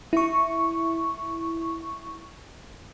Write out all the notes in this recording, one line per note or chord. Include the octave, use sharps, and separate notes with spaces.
E4 C#6